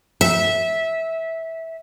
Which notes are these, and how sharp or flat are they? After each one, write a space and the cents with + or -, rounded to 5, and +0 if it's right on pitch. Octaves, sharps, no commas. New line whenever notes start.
E5 -15